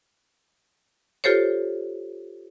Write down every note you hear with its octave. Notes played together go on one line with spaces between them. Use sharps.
F4 G4 A4 C5 C#5